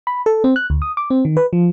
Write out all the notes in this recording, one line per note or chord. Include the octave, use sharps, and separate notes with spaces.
B5
A4
C4
F#6
D2
D#6
D6
C4
D#3
B4
F3